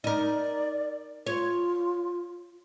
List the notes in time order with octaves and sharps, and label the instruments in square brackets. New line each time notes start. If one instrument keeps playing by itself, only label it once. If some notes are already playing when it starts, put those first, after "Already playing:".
[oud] D#4 A#4 [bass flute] D5
[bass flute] F4 [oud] C#5